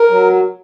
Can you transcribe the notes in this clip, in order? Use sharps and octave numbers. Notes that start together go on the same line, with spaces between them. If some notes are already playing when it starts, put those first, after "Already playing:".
Already playing: A#4
F#3